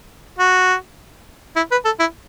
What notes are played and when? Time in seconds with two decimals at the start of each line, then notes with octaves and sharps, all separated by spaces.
0.39 F#4
1.56 E4
1.71 B4
1.85 A4
2.00 E4